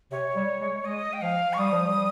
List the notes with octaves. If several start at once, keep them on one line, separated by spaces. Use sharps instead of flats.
C3 C#5
G3
G#3
G#3 D#5
G5
F3 F5
C#6
G3 D#6
F3
G3